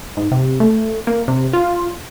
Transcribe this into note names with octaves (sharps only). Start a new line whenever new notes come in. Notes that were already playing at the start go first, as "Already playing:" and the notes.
G#2
C3
A3
A#3
C3
F4